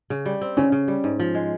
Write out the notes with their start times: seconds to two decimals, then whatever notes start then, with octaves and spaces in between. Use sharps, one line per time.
0.10 C#3
0.26 G3
0.41 C4
0.57 C#3 C#4
0.72 C#3
0.88 G3
1.04 G#2
1.20 F3
1.35 G#3